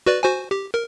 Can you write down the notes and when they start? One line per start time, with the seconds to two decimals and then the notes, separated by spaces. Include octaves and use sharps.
0.06 F#4 B4 D5
0.23 F#4 C5 G#5
0.51 G4
0.74 A#4